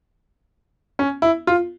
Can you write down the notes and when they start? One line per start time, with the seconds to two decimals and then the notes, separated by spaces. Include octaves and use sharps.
0.99 C#4
1.22 E4
1.47 F4